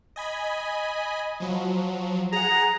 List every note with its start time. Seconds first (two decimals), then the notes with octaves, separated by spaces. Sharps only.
0.16 D#5 G#5 B5
1.40 F3 F#3
2.32 G#4 F#5 A#5